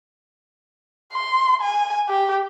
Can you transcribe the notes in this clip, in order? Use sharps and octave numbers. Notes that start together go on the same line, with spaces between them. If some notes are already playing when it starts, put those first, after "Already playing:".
C6
G#5
G4